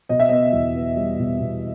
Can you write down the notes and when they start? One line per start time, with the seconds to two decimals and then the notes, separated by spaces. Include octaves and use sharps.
0.09 B2 D#5
0.20 E5
0.29 B3 D#5
0.53 E2
0.75 B3
0.97 G3
1.18 B2
1.40 B2